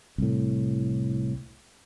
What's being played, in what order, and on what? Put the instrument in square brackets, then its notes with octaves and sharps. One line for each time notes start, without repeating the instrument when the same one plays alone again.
[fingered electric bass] C2 A2